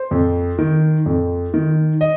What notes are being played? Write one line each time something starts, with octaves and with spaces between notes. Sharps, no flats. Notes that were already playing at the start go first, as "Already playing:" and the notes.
Already playing: C5
F2
D#3
F2
D#3
D#5